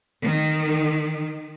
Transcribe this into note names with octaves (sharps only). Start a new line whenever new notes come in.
D#3